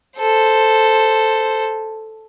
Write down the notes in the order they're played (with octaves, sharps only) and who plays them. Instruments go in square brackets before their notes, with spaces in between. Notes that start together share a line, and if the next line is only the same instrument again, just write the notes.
[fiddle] A4 C5